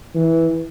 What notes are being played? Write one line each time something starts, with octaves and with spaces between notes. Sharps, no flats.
E3